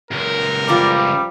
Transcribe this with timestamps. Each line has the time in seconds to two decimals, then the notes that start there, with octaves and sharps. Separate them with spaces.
0.11 C#2 F#2 A#4
0.68 F3 G3 D5 A#5